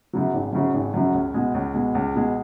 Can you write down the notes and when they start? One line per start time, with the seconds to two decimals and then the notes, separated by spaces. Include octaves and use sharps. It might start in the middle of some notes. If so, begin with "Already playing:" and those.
0.13 F#2 C#3 F#3
0.33 G#1
0.53 F#2 C#3 F#3
0.74 G#1
0.94 F#2 C#3 F#3
1.14 C#2
1.34 B2 G#3
1.54 C#2
1.74 B2 G#3
1.95 C#2
2.16 B2 G#3